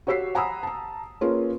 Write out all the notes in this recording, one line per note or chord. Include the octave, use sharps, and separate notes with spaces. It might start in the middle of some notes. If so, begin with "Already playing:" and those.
F#4 G4 C#5 E6 B6 C7
F#5 G#5 A#5 B5 D#6 E6
A5 A#5
A#3 C#4 F4 G#4 A#4 B4